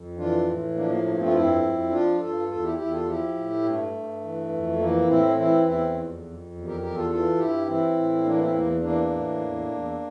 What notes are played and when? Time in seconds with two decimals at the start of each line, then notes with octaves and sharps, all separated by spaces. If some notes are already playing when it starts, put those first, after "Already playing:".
Already playing: F2
0.17 E3 D4 F4
0.47 A2
0.75 F3 A#3 D4
0.90 A#3
1.04 G2 A#3
1.14 A#3
1.18 A3 C4
1.26 F4
1.33 F2 C4 E4
1.63 F2
1.91 F3 D4 F4
2.19 G2 F4 A4
2.48 E2 F4 A4
2.62 E4 G4
2.77 E2 E4 G4
2.92 F4 A4
3.05 F3 E4 G4
3.35 A2
3.63 G2 A3
3.93 G2
4.22 E3
4.49 F2
4.78 E3 A#3
5.07 A2 C4 E4
5.36 E3 C4 E4
5.65 E2 C4 E4
5.94 F2
6.23 F2
6.51 E2
6.66 G4 A#4
6.80 E2 G4 A#4
6.95 F4 A4
7.10 E3 F4 A4
7.37 G2 E4 G4
7.67 E3 C4 E4
7.96 A2
8.24 E3 A#3 D4
8.38 C4 E4
8.53 E2 A#3
8.81 E3 A#3 D4
9.11 A2
9.40 E2
9.68 E2